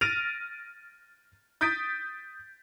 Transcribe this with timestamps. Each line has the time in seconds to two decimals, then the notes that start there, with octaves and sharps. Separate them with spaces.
0.01 F6 A6 A#6 D7 D#7 F7
1.61 D#6 G6 A6 B6 D7